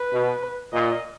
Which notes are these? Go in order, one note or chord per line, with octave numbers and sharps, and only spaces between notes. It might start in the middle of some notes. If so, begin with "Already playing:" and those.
Already playing: B4
B2
A#2 D#5